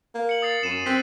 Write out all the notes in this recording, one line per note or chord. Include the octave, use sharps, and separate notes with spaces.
A#3
C#7 F#7
D#6 A6 C7
F#2 D#7 E7
C4 E6 F#6 B6